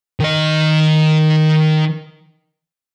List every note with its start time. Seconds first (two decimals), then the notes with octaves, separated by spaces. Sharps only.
0.20 D#3 D#5